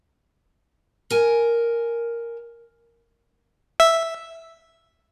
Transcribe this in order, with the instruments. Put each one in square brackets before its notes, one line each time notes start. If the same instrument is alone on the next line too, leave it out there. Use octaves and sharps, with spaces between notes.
[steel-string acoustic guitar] A#4 G#5
[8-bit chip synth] E5